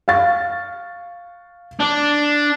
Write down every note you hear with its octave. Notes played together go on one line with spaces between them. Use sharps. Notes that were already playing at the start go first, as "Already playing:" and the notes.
F5 C#6 A6
D4